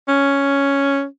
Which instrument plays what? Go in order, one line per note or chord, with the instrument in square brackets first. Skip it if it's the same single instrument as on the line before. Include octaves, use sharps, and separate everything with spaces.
[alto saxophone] C#4